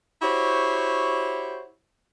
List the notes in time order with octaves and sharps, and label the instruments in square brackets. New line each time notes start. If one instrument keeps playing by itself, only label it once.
[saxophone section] E4 F#4 G4 C5 C#5